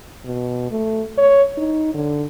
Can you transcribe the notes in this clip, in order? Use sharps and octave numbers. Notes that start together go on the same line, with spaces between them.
B2
A3
C#5
D#4
D3